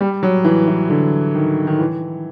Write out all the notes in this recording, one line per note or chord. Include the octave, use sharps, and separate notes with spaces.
G3
F#3
E3
E3
D3
D#3
D#3
E3